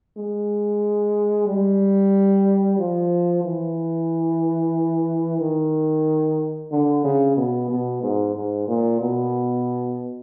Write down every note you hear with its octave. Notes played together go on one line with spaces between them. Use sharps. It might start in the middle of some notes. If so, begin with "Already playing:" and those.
G#3
G3
F3
E3
D#3
D3
C#3
B2
B2
G#2
G#2
A#2
B2